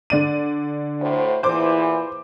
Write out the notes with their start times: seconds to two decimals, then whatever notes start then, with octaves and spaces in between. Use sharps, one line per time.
0.10 D3 D5 D#7
1.01 D2 A2 C5
1.43 E2 A#2 E3 C5 D6